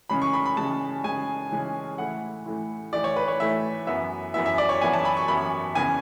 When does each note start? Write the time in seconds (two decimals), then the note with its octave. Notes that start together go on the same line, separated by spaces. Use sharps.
0.10 C#3 E3 G#3 C#4 B5
0.22 C#6
0.33 B5
0.46 B5
0.57 C#3 E3 G#3 C#4 A5
1.04 C#3 E3 G#3 C#4 G#5
1.51 C#3 E3 G#3 C#4
1.98 A2 E3 A3 E4 F#5
2.46 A2 E3 A3 E4
2.93 A2 E3 A3 E4 D5
3.04 C#5
3.16 B4
3.28 C#5
3.40 A2 E3 A3 E4 E5
3.87 F#2 E3 B3 E4 E5
4.34 F#2 E3 B3 E4 E5
4.46 E5
4.58 D5
4.69 C#5
4.81 F#2 E3 B3 E4 G#5
4.93 A5
5.05 B5
5.17 C#6
5.28 F#2 E3 B3 E4 B5
5.75 E2 C#3 E3 B3 G#5